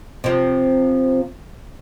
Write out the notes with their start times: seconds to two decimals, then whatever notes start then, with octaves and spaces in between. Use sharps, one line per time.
0.24 C3 F3